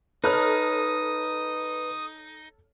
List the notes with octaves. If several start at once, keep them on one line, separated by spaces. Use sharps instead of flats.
D#4 A4 B4 C#5 D#6 F6